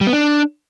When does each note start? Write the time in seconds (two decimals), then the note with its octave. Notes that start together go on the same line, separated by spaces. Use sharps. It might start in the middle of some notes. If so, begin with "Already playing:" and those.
0.01 G3
0.07 B3
0.13 D4